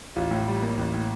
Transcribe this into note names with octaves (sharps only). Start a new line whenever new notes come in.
A1 F4
A2
G3
A#3
A1
A2